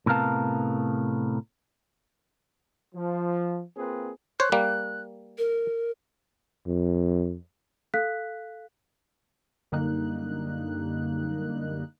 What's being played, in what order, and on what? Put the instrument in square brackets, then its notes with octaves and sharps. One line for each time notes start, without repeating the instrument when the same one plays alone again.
[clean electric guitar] A2 C3 B3 A#4 F5 A5
[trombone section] F3
A#3 C4 F4 G#4 B4
[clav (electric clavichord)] C5 C#5 [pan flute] F#6
[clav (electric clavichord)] G3 A#3
[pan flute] A#4
[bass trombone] F2
[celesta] A4 F5 F#6 B6
[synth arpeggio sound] F#2 D3 G3 A#3 D#4 F#6